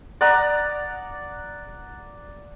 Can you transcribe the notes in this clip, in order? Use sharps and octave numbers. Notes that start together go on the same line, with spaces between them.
D5 F#5 A#5 D#6